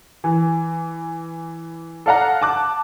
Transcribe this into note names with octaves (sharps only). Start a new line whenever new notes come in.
E3
A4 D5 F5 F#5 A#5
A5 D6 F#6